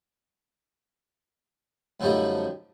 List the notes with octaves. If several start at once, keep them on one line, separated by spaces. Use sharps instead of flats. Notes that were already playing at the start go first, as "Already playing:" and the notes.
F#2 D3 F3 G3 A3 D#4